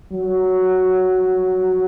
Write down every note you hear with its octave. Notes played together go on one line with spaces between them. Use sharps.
F#3